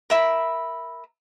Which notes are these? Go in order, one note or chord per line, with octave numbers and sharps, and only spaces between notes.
A#4 E5 B5